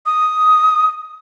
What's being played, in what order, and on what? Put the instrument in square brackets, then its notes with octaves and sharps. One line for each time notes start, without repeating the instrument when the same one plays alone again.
[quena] D#6